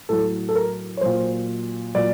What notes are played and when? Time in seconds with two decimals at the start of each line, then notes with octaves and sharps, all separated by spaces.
0.09 A2 F#3 A4
0.49 A4
0.55 A#4
0.97 C#5
1.01 A#2 F#3 C5
1.95 A#2 F#3 D5